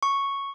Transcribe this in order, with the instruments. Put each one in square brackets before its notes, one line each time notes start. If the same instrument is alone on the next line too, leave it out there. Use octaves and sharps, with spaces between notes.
[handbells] C#6